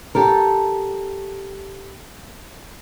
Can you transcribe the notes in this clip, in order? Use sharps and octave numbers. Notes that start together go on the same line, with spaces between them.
G4 A4 A#4